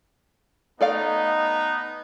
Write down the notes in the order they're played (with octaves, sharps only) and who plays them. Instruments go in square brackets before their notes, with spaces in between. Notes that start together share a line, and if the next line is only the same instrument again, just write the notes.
[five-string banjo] A3 D5 F5 [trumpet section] B3 D#4